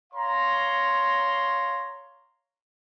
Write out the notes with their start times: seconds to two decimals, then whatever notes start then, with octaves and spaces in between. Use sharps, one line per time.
0.13 C#5 F5 A#5 C6